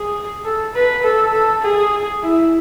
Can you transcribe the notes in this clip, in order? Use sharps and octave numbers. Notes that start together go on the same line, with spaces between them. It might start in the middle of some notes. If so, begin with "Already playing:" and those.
Already playing: G#4
A4
B4
A4
A4
G#4
E4